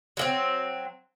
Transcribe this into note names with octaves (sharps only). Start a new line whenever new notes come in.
F#3 A#3 C4